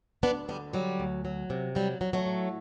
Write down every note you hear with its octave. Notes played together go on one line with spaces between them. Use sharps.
D2 B3 D4
D3 G3 B3
F#3 G3
D2
F#3
C3
F#3 G3
F#3
F#3 A3
A2